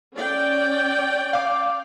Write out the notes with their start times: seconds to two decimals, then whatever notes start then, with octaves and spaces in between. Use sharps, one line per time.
0.13 C#4 D5 G5
1.33 F5 D6